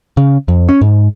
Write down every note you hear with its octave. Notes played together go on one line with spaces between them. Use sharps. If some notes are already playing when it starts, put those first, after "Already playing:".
C#3
F2
C#4
G#2